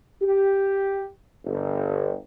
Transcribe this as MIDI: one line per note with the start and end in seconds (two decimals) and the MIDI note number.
0.22 1.08 67
1.45 2.14 31